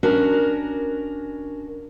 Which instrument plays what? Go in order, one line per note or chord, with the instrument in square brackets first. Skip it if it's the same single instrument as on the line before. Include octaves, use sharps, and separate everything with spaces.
[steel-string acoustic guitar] C#4 D4 F#4 A#4